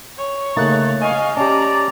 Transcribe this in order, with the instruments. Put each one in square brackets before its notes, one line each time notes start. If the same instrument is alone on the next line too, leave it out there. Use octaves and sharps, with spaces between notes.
[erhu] C#5
[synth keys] C#3 F#6 A6 [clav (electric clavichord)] A3 A#3 D#4
[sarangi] D#5 [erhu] F5 [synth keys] G#5 C#6
[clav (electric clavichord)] C#4 G4 [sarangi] D5 [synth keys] A5 [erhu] A#5